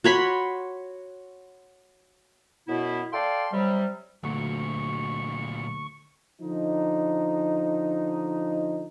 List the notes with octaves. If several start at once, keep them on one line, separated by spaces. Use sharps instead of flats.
F#4 C#5 B5 C6
F#2 B2 B3 E4
A4 D5 F5 G5 C6
C3 F#3 G3
D2 A#2 F#3 C#6
D3 F3 D#4